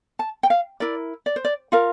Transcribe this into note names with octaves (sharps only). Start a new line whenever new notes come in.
A5
G5
F5
E4 A#4 D5
D5
C5
D5
F4 A#4 F5